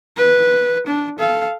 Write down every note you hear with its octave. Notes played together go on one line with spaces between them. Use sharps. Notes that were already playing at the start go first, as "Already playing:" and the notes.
B4
D4
A4 F5